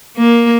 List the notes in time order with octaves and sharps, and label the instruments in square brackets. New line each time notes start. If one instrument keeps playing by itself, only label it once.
[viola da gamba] A#3